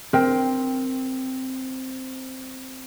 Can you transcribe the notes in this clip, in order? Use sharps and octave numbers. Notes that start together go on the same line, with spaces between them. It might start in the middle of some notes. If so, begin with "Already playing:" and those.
C4 A#4 G5